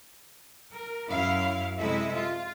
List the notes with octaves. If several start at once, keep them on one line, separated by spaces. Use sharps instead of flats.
A#4
F#2 F#3 E4 F5
C3 G#3 E4 A4 E5
F4